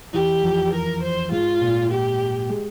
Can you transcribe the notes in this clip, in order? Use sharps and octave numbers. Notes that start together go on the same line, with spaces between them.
E2 E3 G4
F2 F3
A#4
C5
G#2 G#3 F4
A#2 A#3
G4
G#3